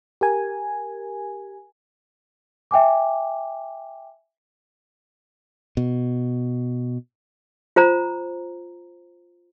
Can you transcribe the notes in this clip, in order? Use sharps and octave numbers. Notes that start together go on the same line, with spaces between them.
G4 A#4 G#5
E5 G5 G#5 D6
B2
F4 C5 A#5